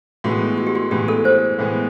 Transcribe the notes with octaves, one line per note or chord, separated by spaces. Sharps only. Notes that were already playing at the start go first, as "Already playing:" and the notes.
A2 E3 G#3 B3 F#4
F#4
G4
F#4
A2 E3 G#3 B3 G4
A4
C5
A2 E3 G#3 B3